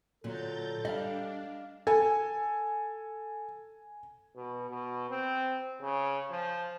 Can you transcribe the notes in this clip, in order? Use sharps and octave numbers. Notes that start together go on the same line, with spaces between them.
A#2 D3 F#3 A4 A#5 G6 A6
G3 D4 D#5 F5
A4 G#5
B2
B2
C4
C#3
F3